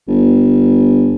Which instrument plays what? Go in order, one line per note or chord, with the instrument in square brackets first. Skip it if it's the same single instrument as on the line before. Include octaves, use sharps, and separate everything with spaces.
[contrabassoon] G1